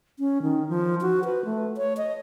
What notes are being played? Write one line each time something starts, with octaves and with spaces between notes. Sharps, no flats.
C#4
D#3
F3
F#4
B4
A3
C#5
D#5